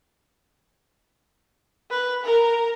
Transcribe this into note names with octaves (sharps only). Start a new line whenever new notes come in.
B4
A#4